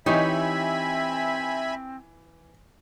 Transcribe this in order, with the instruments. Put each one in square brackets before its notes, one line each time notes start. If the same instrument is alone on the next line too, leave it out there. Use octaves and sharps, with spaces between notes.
[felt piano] E3 [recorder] C4 [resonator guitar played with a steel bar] D#4 G4 C#5 [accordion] E5 G#5 B5